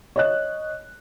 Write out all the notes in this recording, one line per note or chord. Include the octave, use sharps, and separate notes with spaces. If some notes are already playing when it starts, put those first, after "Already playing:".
C#5 D#5 F#6